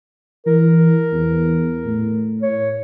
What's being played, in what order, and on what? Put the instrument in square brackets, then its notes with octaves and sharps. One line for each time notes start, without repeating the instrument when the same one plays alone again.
[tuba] E3 [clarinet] A#4
[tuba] E2
A2
[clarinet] C#5